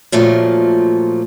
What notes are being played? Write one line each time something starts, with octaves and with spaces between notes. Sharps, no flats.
A#2 F3 F#3 A3